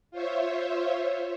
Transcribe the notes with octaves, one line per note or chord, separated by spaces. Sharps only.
F4 C5 C#5 E5